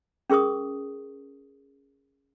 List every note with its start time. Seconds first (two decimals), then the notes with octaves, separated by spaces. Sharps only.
0.30 C#4 G#4 A#4 C#6 D#6